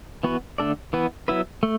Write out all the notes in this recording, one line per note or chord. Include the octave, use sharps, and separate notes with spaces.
E3 B3 F#4 B4
D3 A3 D4 A4 D5
E3 B3 E4 B4
F#3 B3 E4 B4 E5
A3